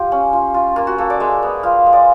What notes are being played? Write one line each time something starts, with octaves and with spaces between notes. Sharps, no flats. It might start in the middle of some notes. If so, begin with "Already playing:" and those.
Already playing: F4 G4
C#4
F4
F4
A#3 F4
F#4
A#3 A4
D5
G#3 E5
B3
F4 F5
G#3
D5